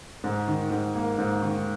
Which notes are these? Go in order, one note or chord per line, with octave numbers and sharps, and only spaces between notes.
G#2
D#3
G#2
A#3
G#2
D#3